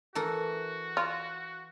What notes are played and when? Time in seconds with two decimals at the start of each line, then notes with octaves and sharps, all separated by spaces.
0.15 E3 F#4 A4 A#4
0.97 F4